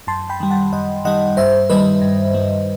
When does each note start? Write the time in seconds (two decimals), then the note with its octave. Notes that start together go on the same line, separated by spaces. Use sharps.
0.07 F#2 A5 C6
0.30 G5 B5
0.40 D#3 G3 G5
0.51 F#5 A5
0.73 F#2 D#5 F#5
1.05 D#3 G3 D#5 F#5
1.37 G2 C5 E5
1.70 D#3 G3 B4 D#5
2.02 G2
2.34 D#3 G3